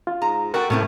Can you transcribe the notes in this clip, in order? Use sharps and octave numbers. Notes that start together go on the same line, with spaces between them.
F4
G#2 A#5
A3 F#4 A4 A#4 G5
A2 C3 C4 C#4 E4